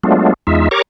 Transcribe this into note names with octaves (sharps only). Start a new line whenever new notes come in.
F#3 G#3 A3 B3 D4 F4
E2 G#3 D#4 F4 E5
G4 A#4 C#5 A#5 C#6 D6